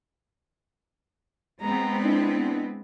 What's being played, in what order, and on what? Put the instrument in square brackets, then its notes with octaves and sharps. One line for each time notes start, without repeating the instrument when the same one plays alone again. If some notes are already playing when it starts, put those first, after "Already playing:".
[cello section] G#3 B3 C4 [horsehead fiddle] A#5
[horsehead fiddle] D4 E4